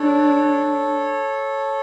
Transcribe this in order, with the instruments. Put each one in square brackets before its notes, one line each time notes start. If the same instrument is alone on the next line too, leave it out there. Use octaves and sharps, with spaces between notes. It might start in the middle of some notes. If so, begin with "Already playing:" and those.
Already playing: [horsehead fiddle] D4 [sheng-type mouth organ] A4 C#5